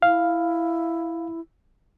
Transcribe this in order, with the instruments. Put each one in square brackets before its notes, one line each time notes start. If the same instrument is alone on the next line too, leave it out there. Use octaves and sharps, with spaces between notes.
[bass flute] E4 [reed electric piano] F5